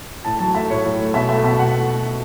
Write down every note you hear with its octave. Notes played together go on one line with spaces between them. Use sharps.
A2 A5
F#3 A5
A3 E5
A2 C#5
A2
A3
B2 E5
A3 E5
B2 E5
B2 F#5
A3